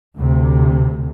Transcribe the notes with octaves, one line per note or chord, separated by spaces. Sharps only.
D2 C3